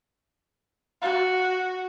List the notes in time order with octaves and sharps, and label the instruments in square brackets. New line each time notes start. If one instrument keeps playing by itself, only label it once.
[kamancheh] F#4